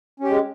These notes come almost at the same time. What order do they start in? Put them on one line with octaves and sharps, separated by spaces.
C#4 G4 G#3